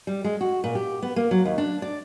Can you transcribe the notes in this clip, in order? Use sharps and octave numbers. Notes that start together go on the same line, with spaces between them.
G3
G#3
F#4
A#2
G4
B3
A#3
F#3
D#2
D4
D5